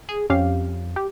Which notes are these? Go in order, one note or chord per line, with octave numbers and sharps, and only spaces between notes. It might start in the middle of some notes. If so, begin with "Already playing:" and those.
G#4
F2 C#4 G4 F5
G4